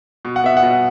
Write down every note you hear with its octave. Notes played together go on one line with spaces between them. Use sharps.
B2
F#5
B3 E5
F#5
B2